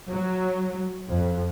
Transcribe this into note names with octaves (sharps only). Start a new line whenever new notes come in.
F#3
F2